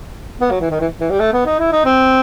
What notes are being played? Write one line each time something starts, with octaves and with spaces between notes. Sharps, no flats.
B3
F#3
E3
D#3
E3
E3
G3
A3
B3
D#4
E4
D#4
C4